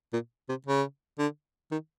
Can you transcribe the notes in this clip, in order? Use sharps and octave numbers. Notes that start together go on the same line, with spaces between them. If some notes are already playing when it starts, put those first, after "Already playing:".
A#2
C3
C#3
D3
D#3